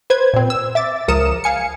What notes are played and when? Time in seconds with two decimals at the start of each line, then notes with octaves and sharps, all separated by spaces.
0.10 B4 C5 G#6
0.34 A#2 C4
0.50 E6
0.75 E5 D6 A6
1.08 C#2 F3 A#4 D#6 C#7 E7
1.44 F5 G#5 C#7